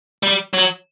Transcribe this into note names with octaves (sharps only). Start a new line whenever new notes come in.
G3
F#3